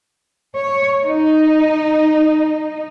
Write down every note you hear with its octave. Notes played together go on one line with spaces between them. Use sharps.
C#5
D#4